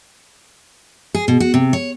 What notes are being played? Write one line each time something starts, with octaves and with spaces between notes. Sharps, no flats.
G#4
B2
F#4
C3
C#5